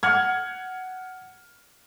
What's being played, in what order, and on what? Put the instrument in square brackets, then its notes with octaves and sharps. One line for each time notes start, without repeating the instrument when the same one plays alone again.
[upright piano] F#5 F6 G#6